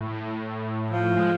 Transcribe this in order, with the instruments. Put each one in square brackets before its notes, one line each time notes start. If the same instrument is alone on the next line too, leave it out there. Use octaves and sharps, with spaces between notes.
[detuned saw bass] A2
[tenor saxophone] F3
[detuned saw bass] G#3